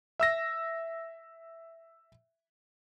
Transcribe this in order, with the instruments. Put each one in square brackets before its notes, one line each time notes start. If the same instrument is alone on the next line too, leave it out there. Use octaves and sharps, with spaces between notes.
[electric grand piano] E5 E6 A#6